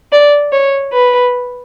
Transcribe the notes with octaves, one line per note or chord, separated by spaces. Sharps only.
D5
C#5
B4